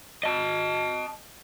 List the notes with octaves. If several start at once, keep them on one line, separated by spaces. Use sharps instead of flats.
D#5 A5